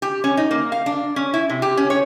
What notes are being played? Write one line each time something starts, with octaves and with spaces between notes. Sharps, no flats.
G4
C#4
D#4
A#3
F5
D4
C#4
E4
C3
G4
C#4
C#5